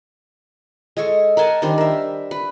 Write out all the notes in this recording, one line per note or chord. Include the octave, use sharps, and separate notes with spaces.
G#3 G#4 A4 C#6
A#4 F#5 G#5 A5
D#3 G3 D4 C5
A#4 E5
B4